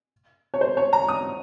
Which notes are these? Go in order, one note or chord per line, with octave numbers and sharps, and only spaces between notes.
C#5
C5
C#5
A#5
D#6